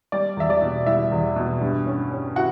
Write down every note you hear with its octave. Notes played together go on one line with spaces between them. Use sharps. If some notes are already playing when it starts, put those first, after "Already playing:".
G3 D5
E2 E5
D5
B2
G3 E4 E5
E2
B2
G2
C#4
C#4
E4 F#4 F#5